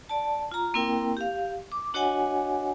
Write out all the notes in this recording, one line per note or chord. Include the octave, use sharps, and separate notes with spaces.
D5 A5
F4 A#5
A#3 C4 E4 A#4 G5
G4 F5
D6
D4 F#4 C#5 D#5 F#5 G#5